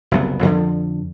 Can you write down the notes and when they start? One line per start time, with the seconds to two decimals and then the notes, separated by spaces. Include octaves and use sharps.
0.11 F#1 C2 B3
0.43 F2 D3 F3